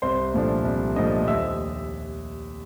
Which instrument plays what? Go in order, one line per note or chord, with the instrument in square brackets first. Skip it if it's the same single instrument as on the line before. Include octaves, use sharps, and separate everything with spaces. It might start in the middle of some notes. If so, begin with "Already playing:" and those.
[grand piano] C2 C5 C6
A#2 F3 A3 D4
C2
A#2 F3 A3 D4 D#5 D#6
D#2 E5 E6